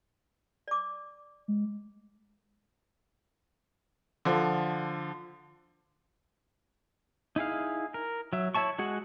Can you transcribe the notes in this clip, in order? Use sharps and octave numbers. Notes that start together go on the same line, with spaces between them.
D5 D6
G#3
D3 F3
D#4 E4 G#4 F5
A#4
F#3 E5
E4 C#5 E5 A5 C#6
G#3 F#4 G#4 F#5